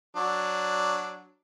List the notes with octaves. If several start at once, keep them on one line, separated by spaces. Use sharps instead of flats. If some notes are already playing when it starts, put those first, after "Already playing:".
F#3 D4